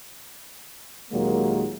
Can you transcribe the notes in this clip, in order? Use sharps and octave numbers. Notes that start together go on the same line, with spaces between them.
D#2 A#2 F#3 G#3 A#3